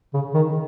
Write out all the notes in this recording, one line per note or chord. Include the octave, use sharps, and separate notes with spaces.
C#3
D#3